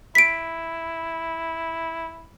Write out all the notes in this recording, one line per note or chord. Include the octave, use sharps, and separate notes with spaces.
E4 B6 D7